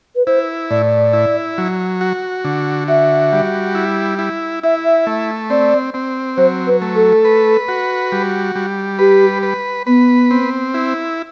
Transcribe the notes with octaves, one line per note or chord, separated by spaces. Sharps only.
B4
E4 C5
A2 D5
E4
F#3
F#4
D3
F#4 E5
G3
E4
E4
E4 E5
E5
A3
C4 D5
C4
F#3 C5
B4
A3
A4
B4
F#4
G3
G3
G4 B4
B4
B3 B4
C4
E4